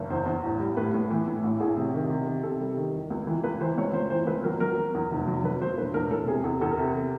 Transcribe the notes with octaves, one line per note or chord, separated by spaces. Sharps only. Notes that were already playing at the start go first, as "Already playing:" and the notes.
Already playing: F#1
E2 C5
E2
A1
G3
A2 B4
A2
E3
A2
A1
A1 G#4
C3
D#3
C3
D#3
C3 A4
G3
D#3
E2
C#2
E3
C#2 B4
E3 C5
C#2 C#5
C#2 C5
E3 C5
C#2 B4
F#3 A#4
F#3 A#4
F#3
E2
F1
F#3
F#3 B4
F#3 C5
E1 B4
E1 A#4
E1 A4
C3 G#4
E2 A4
E2 A4
A#4
C3 A4